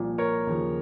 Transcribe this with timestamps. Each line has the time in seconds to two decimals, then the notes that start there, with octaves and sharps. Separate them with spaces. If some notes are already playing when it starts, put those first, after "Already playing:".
Already playing: C2 A#2 F3
0.18 A#4 C#5
0.47 D#2 C#3 F3